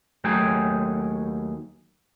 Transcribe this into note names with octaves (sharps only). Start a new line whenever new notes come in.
D#2 F#3 A3 G#4 G5 G#5